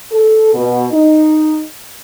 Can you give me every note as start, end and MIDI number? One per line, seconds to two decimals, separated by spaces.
0.12 0.54 69
0.54 0.85 47
0.91 1.62 63